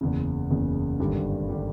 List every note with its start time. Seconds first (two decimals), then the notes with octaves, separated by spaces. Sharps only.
0.01 F#1 E2 C#3
0.51 F#1 E2 C#3
0.99 G#1 G2 D3 G3
1.49 D3 G3